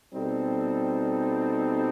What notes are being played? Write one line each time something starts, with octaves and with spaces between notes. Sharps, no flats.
B2 G3 C4 D#4 A4